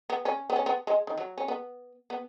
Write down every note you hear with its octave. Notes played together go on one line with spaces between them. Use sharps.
B3
C#4
B3
C#4
B3
G#3
D#3
F#3
C#4
B3
B3